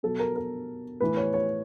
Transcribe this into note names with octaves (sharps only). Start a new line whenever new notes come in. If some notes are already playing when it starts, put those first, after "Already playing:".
B2 F#3 A4
A#4
A#4
A2 E3 B4
C#5
C#5